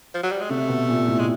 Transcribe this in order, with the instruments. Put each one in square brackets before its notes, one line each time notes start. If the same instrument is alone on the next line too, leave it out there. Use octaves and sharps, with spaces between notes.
[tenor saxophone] F3
F#3
G3
G#3
[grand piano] C3 [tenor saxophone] A3
[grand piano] B2
A#2
A2
[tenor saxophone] G#3